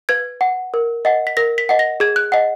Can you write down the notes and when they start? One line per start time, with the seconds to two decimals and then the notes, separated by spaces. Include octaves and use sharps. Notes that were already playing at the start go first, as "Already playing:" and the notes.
0.09 B4 G#6
0.41 F#5
0.74 A#4
1.05 D#5 F#5
1.27 B6
1.37 A#4 A#6
1.58 B6
1.69 D#5 F#5
1.79 A#6
2.00 G#4 G#6
2.16 F#6
2.32 D#5 F#5